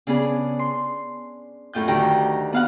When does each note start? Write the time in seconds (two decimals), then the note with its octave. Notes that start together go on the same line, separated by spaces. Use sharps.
0.07 C#3 B3 D4 G#4
0.59 C6
1.73 F#2 A2 F4 G6
1.88 D2 D#3 F#3 G4 G5 A#5
2.53 B3 F5 F#5